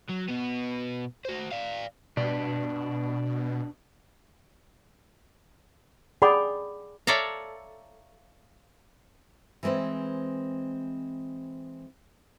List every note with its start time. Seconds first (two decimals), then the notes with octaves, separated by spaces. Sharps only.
0.10 F#3
0.29 B2 B3
1.25 F#4 C5
1.52 D5 F5
2.17 B2 D4 B4 D5
6.22 G#4 D5 F#5 G5 B5 D6
7.07 A4 C#5 D5 E5 F5 A#5
9.63 E3 G#3 C4 B4 C5